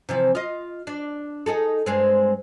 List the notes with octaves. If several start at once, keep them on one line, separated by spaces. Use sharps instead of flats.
C3 E3 F3
F4 D#5
D4
D#4 G#4 A4
G2 G#3 C4